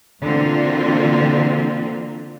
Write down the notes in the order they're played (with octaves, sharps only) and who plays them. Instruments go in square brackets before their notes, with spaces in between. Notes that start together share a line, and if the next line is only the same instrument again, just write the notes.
[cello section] B2 D3 E3 A#3 C4 F4